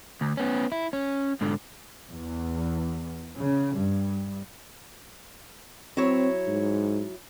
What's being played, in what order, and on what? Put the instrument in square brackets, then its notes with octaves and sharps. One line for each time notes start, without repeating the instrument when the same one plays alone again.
[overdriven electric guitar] D2
B3 C#4
E4
C#4
G#2 D3
[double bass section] E2
C#3
G2
[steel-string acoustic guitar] F#3 E4 C#5 [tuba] C4
[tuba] G#2